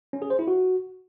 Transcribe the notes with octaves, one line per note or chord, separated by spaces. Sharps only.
C#4
G#4
C5
E4
F#4